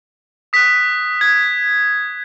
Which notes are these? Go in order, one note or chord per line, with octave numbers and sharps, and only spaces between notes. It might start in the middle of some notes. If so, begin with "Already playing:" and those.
D#6 F#6 B6
D#6 F#6 G#6